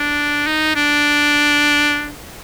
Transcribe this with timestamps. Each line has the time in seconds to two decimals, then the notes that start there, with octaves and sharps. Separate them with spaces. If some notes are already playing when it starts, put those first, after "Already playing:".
Already playing: D4
0.47 D#4
0.76 D4